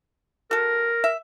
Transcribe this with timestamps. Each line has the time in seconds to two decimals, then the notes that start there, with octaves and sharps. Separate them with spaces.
0.51 F#4 A4 A#4
1.04 E5